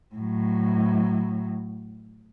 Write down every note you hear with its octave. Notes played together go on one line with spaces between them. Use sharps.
A2 F#3